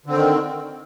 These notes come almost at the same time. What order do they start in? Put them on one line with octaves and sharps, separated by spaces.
D3 C4 D#3